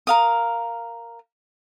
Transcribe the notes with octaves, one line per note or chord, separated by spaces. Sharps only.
A#4 F5 D#6